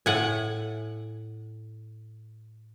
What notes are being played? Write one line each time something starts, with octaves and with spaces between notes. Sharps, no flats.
A2 F#5 G#5